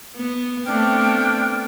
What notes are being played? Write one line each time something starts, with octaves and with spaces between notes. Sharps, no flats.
B3
A3 B3 C4 D4 G5 F6